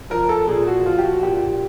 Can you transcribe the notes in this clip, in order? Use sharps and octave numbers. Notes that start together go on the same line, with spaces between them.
F3 A#4
A4
A#2 G#4
F#4
F3 F4
G4
F#4
A#2 G4